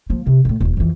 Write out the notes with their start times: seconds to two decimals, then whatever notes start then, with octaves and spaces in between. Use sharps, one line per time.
0.10 F3 A#3
0.27 C3
0.45 A2 C3
0.61 D#1 F#2
0.77 F2 E3